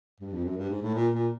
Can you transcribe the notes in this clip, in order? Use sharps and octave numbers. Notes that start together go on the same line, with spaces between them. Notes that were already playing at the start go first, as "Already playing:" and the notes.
G2
F2
F#2
G2
G#2
A2
A#2
A#2